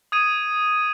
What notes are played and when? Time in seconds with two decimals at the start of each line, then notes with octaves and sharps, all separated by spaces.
0.12 D#6 G#6 D#7